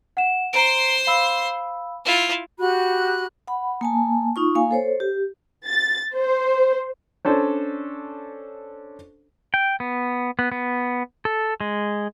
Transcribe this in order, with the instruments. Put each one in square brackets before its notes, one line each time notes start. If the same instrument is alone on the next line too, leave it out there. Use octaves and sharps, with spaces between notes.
[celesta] F#5 E7
[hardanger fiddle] C5 C6 [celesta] A#5 D7
[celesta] F5 B5 E6
[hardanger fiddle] E4 F4
[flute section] F#4 G4 B5 F#6
[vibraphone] F#5 B5
A#3 G#5 A5
D#4 F4 C#6
A#3 F5 G#5
A4 C5 C#5
G4
[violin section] A6
C5
[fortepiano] C#4 D4 A4 C5 C#5
[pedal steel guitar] G5
B3
B3
B3
A4
G#3